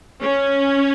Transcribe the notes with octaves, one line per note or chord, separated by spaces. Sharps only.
C#4